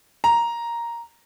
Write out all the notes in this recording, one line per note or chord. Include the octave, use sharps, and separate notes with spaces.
A#5